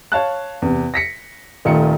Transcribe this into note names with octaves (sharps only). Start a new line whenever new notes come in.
C#5 F5 A5 F#6
E2 C3
A#6 B6 C#7
D#1 D#3 A3 F4 C#7